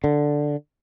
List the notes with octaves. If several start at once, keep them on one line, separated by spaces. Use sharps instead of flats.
D3